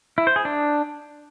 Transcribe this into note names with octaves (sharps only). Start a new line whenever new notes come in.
E4
C5
G#4
D4